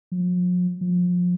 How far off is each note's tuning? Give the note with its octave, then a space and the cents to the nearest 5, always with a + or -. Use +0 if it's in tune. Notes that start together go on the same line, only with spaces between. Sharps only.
F3 +45
F3 +30